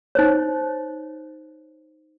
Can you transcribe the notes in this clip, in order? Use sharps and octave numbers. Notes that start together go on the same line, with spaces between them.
D#4 C5 C#5